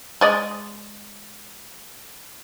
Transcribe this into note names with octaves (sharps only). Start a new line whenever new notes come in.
G#3 D5 D#5